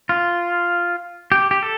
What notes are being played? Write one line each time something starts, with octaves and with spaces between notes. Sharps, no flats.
F4
G4
G4
A4